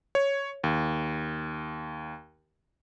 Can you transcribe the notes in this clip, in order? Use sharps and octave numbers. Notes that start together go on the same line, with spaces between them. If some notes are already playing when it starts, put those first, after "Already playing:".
C#5
D#2